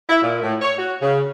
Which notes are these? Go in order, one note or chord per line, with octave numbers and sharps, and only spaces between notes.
E4
A#2
A2
C#5
F#4
C#3